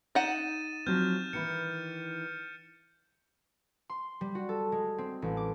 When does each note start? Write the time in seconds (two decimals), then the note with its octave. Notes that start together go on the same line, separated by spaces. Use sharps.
0.15 D#4 F#5 A6 D#7 E7
0.86 F3 F#3 C4 F6 G6
1.33 D#3 E3 E4 C#7
3.89 C6
4.21 G3
4.35 F#4
4.49 A4
4.72 G#3
4.98 C4
5.22 A1
5.37 D6